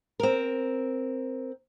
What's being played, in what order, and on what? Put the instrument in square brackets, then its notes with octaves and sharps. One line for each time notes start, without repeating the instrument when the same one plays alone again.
[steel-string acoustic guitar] C4 A#4